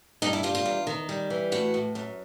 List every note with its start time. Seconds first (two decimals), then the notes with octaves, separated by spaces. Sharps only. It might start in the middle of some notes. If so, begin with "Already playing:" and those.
0.22 G2 D#4
0.33 E4
0.43 G3 F4
0.55 F4
0.65 E2
0.87 D#3
1.09 G3
1.30 E3
1.52 A2 F#4
1.74 A2
1.95 F#2